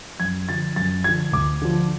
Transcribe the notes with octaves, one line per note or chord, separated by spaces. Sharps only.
F#2 G#6
D3 F3 A6
F#2 A6
D3 F3 G#6
D2 D6
D3 F3